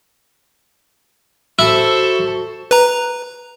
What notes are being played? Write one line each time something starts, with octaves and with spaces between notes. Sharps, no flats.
E4 F#4 A4 C5
B4 A#5